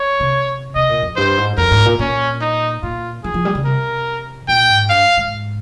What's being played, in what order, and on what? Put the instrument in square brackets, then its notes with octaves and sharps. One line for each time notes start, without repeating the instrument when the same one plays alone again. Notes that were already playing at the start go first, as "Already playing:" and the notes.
Already playing: [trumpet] C#5
[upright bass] C3
[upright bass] C3 [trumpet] D#5
[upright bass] A#2
F2
[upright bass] G2 [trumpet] C5
[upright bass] G#2
[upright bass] F2 [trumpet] A#4
[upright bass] G#2
A#2
[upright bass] A#2 [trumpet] C#4
[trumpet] D#4
[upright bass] A#2 [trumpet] F4
[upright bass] F3 [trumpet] G#4
[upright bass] F3
G3
C#3
[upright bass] C3 [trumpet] A#4
[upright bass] A#2 [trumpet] G5
[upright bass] G#2
[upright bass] G2 [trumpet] F5
[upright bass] G#2